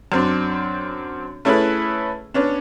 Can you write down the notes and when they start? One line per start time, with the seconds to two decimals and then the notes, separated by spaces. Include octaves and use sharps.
0.12 F#2 C4 D4
1.45 A3 C#4 E4 G#4 A4 B4
2.34 B3 C#4 D4